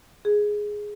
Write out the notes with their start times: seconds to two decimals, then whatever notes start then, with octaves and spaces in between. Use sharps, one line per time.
0.25 G#4